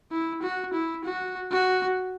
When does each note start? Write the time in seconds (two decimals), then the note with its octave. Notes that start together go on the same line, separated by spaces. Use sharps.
0.11 E4
0.42 F#4
0.73 E4
1.05 F#4
1.51 F#4